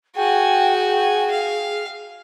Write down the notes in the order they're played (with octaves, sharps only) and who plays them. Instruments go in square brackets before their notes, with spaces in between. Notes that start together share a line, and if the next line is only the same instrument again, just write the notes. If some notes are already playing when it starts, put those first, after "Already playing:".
[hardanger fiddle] F#4 G#5 [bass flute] G#4 [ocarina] G5
[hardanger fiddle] F5